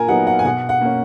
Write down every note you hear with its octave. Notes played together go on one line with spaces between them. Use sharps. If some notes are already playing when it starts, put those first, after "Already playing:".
Already playing: A#2 A#4 G#5
F#3 B3 D#4 F#5
F#5
G#5
B2 F#5
F#5
A#3 C#4